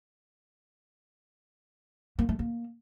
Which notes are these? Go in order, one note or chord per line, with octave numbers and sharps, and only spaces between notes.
A#3
A3
A#3